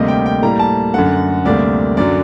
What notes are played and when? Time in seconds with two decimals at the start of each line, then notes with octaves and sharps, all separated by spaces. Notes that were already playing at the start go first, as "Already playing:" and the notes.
Already playing: D2 C3 G3 A#3 D#5
0.08 G5
0.26 G5
0.42 A2 G3 A#3 A#5
0.59 A5
0.94 F#2 D3 A3 F#5
1.45 D2 C3 G3 A#3 D5
1.97 F#2 D3 F#3 D5